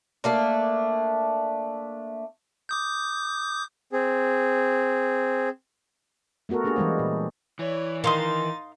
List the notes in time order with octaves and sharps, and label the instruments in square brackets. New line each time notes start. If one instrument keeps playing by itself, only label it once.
[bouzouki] A3 A#3 D4
[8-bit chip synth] D6 D#6 G6
[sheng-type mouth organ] C4 G#4
[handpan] A3 B3 F#4 A4 A#4
A3 A#3 D4 G4 G#4
E3 G3 G#3 C5
A#2
[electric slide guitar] E3 [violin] C#5 D5
[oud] D#3 [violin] D#4 A6 [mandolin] F5 C6 D#6